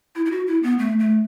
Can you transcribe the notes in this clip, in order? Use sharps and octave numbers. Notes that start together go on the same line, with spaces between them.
E4
E4
F#4
E4
B3
A3
A3